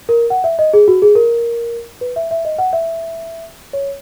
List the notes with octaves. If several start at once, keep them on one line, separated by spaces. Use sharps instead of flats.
A#4
F#5
E5
D#5
G#4
F#4
G#4
A#4
B4
E5
E5
D#5
F#5
E5
C#5